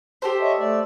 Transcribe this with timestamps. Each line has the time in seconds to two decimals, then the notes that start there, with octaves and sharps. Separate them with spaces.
0.22 G4 A4 C5
0.41 C#5 D#5 E5
0.59 A3 D5